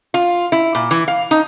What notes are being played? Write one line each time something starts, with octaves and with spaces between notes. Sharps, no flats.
F4
E4
A#2
E3
F5
D#4